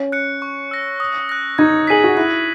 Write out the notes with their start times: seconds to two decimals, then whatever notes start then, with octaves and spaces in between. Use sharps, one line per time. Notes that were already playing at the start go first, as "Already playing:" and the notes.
Already playing: C#4
0.12 F#6 C#7
0.42 C#6
0.71 E6 A#6
1.00 D#6
1.29 F#6 A#6
1.58 D#4 G#6
1.87 G#4 B6 D#7 F#7
2.04 F#4
2.17 E4 F#6